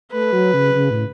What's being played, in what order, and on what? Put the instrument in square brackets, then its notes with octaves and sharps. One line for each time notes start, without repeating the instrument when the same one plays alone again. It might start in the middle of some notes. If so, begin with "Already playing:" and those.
[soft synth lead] A3 [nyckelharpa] B4
[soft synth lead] F#3
C#3
C#3
A2